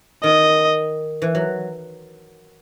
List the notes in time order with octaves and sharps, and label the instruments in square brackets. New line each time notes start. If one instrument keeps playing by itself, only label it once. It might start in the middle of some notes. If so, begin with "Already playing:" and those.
[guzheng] D#3 [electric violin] D#5
[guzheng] E3
F#3